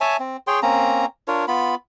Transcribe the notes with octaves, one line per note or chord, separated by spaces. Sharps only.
C#5 E5 G#5 A5
C4
G#4 C#5 G5 C6
A#3 C4 C#4 A#5
D4 F4 A#4 C#5
B3 F4 B5